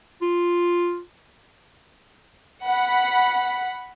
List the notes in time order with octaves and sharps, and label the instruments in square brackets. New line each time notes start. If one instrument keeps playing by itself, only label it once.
[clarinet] F4
[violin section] F#5 B5